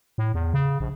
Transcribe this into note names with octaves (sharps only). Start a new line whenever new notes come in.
A2
E2
C#3
A#1